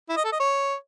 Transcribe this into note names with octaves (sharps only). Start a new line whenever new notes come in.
E4
D#5
A4
D#5
C#5